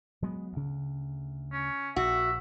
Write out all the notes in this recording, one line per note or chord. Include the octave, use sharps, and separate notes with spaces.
F#3 G#3 B3
D2 C#3
C#4
A#1 F#4 E5